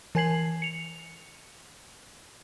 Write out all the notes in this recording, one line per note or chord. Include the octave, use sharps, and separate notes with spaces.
E3 A#4 G#5 G#6 C7 F#7
C#7 F7